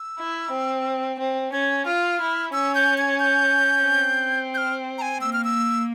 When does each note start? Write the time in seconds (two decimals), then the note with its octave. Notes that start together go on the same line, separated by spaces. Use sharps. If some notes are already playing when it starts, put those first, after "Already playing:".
Already playing: E6
0.18 E4
0.51 C4
1.19 C4
1.52 C#4 G#6
1.85 F4 F6
2.19 E4
2.53 C#4 E6
2.75 G6
2.98 G#6
3.20 G6
3.86 C4
4.54 G6
4.57 F6
4.98 A#5
5.02 G#5
5.21 A#3 E6
5.33 F6
5.44 E6